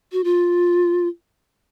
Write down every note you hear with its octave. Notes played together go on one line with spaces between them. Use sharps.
F#4
F4